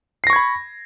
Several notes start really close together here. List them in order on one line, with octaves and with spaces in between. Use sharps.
C7 A#6 C#6 G#6 B5